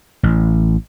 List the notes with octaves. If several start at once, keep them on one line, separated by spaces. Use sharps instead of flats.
A1